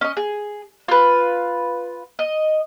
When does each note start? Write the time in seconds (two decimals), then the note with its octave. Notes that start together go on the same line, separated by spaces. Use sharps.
0.01 C#4 D#5
0.17 G#4
0.88 F4 B4
2.19 D#5